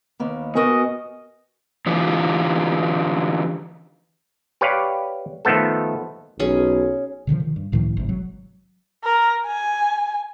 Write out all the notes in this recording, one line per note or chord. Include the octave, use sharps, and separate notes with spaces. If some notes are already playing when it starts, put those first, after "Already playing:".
D#2 A#3 B3
B3 F#4 A#4 D#5 G#5
D3 E3 F4 G4
G4 B4 C#5 D5 F5
D#3 F3 A3 B3 A4
B1 C#4 G#4
B2 D3 D#3 F3
D#3
G2
C#2 A2 D#3 F3
G#1 C3
F#3
A#4
G#5